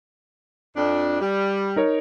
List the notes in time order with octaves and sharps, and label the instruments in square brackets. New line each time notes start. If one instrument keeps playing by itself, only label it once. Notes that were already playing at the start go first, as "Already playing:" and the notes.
[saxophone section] F2 D4
G3
[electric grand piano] D#4 A#4 C#5